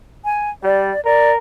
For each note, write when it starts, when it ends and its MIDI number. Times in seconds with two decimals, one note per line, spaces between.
0.25 0.50 80
0.63 0.92 55
0.63 1.01 74
1.05 1.37 70
1.05 1.31 74